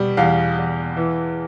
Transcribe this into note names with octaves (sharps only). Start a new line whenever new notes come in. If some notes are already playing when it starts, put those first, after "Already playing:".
Already playing: B2 G3
E2 F5
E2
E3